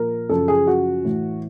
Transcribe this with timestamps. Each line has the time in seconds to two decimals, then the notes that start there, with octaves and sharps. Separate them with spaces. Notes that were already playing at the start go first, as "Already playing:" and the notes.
Already playing: A#2 F3 A#4
0.29 F#2 C#3 F3 A4
0.48 G#4
0.67 F#4
1.05 A2 E3